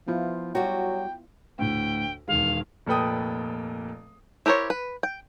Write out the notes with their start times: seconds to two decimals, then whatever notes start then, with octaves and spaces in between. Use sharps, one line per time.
0.08 F3 B3 E4 F4
0.55 F#3 G3 F#4 G5
1.58 D2 A2 G5
2.28 E1 D#3 G#3 F5
2.86 F1 A#2 A4 B4 G5 D#6
4.46 E4 G4 A#4 C5 C#5
4.70 B4
5.03 G5